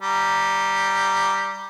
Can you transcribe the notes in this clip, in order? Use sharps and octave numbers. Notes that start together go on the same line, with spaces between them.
G3 A#5